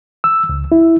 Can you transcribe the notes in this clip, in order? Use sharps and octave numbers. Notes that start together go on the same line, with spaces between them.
E6
C#2
E4